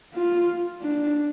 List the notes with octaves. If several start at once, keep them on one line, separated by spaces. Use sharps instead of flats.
F4
D4